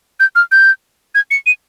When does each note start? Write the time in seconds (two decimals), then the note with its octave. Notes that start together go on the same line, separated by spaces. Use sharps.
0.20 G6
0.35 F6
0.52 G6
1.15 G#6
1.31 C#7
1.46 D#7